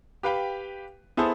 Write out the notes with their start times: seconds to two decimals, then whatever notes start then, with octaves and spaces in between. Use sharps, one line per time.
0.23 G4 B4 F5 G5
1.17 B3 E4 G#4 A4 C5